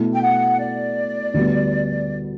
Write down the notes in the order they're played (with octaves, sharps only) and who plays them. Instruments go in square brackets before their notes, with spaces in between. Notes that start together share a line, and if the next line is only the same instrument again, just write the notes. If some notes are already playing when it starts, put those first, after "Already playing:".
Already playing: [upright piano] B2 A3 E4
[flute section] G5
F#5
D5
[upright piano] D2 D3 G3 B3